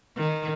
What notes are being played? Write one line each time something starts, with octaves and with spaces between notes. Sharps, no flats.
D#3